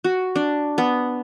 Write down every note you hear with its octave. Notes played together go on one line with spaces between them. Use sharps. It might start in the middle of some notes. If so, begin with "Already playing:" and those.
F#4
D4
B3